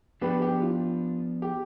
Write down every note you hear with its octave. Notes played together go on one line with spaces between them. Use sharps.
F3 B3 D4 G4 B4
G4
F4
G4